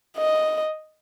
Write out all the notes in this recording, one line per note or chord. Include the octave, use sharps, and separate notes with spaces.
D#5